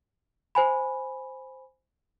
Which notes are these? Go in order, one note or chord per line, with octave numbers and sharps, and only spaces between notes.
C5 G#5 B5